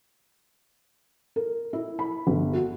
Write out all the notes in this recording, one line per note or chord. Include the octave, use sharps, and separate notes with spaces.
A#4
E4
B5
G1
F#4